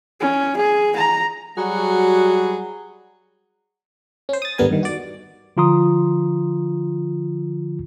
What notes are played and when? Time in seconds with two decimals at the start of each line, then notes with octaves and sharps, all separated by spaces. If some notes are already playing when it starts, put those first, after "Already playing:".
0.20 C#4
0.57 G#4
0.96 A#5
1.57 F#3 G3 F#4 G#4
4.29 C#4 C5
4.42 D#6 A6
4.58 G#1 D3 G3 B3 A#4 G#5
4.70 G2 D#3
4.83 F#4 D5
5.57 D3 F3 F4 A#5 C6 D#6